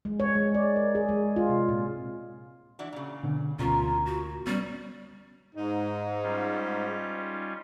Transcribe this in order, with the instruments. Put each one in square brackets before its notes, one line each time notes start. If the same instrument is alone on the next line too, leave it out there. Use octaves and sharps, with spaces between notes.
[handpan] G#3
C#5
G#3
D5
A#4
G#4
G#3
F4
C3
A#2
[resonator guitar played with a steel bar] E3 D4 F#4
A#2 C#3
[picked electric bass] B2 D3
[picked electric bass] D2 B2 [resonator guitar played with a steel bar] A#3 C#4 A#4 [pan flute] F4
[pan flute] F#4
[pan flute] G3 [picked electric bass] B3 [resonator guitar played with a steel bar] C#4
[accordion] G#2 [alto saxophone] D#4
[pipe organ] G3 C#4 F4